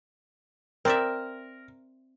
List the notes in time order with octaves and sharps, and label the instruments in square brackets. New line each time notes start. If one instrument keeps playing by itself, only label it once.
[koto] C4 D5 E5 [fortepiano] A#4